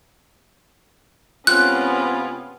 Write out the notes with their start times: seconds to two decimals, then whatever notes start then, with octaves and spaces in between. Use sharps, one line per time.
1.47 C3 G#3 B3 C#4 F4 F#6